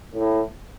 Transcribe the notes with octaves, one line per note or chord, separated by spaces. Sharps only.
A2